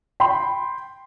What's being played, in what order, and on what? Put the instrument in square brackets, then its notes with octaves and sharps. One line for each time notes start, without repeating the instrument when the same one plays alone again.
[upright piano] G5 B5 C6